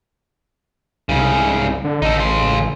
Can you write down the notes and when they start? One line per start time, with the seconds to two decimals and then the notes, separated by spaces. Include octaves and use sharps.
1.09 C2 G#2 C#3
1.85 D3
2.02 A1 D#4 A4
2.17 C#3 C6